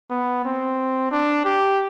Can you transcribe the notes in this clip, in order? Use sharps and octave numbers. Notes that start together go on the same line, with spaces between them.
B3
C4
D4
G4